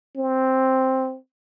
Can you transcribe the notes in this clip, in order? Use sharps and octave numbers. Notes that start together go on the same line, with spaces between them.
C4